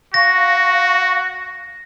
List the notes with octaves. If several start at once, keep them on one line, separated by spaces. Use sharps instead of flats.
F#4 F5 C#6 A#6